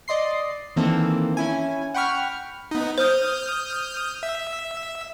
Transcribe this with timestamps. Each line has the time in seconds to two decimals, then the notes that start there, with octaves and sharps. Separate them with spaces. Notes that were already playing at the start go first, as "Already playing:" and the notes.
0.08 D5 D#5 C6 C7
0.76 D#3 E3 A#3 C4 A4
1.37 C#4 E4 G#5
1.94 F#5 G5 B5 C#6 F6
2.71 B3 D#4
2.98 C5 D#6 F6 G6
4.23 E5